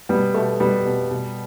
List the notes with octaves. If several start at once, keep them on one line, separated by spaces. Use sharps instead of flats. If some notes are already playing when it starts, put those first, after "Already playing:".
B2 G3 B3
B2 A3
B2 G3 B3
B2
B2